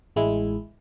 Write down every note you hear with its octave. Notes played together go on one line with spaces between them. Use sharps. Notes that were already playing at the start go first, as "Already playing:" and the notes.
A1 G#3 E4